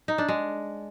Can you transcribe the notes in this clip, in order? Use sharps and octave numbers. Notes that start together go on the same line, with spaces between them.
D#4
D4
G#3